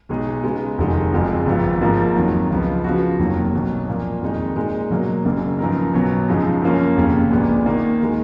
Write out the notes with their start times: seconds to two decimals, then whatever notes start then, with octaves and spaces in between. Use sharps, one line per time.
0.09 B1 B2 G#3 D#4 G#4
0.43 C#3 G#3 B3 D#4
0.78 F1 F2 D#3 G#3 D#4
1.13 F#1 F2 F3 G#3
1.46 G#1 G#2 F3 B3
1.81 G#2 F3 A#3
2.16 F2 D#3 F#3
2.51 C#2 C#3 F3 B3
2.84 C#3 F3 B3 F#4
3.19 F1 D#2 D#3 F#3
3.53 B1 B2 F#3
3.88 A#2 F3 A#3
4.22 F2 D#3 G#3 D#4
4.56 A#2 G#3 D#4
4.90 B2 F#3 A#3
5.25 F#1 F#2 C#3 F#3 A#3
5.59 F#2 F3 B3 D#4 A#4
5.94 B1 B2 F#3 B3
6.28 F#2 C#3 F3 G#3 D#4
6.62 F#2 F3 A#3 C#4
6.97 F1 D#2 C#3
7.31 A#1 A#2 G#3 B3
7.66 D#2 D#3 A#3 D#4
8.01 D#3 G#3